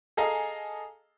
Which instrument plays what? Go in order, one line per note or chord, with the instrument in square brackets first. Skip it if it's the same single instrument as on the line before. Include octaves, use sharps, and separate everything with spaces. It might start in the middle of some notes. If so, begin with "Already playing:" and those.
[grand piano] G#4 A4 D#5 F5 G#5 A#5